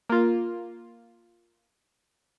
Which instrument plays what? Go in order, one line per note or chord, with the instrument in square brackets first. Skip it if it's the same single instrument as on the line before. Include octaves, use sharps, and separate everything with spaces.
[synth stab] A#3 F4